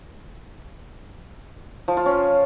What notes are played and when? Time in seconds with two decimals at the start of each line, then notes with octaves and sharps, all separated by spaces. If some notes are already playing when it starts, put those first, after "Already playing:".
1.88 F3
1.97 F4
2.06 C#4